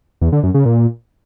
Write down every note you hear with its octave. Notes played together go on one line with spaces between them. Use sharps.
E2
D3
F#2
C#3
A#2